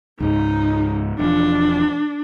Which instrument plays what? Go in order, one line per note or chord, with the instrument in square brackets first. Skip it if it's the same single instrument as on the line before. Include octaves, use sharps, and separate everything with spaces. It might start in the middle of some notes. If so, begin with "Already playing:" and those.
[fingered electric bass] C#2 G#2 G#3 [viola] D#4
[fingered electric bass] E1 E2 F3 [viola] D4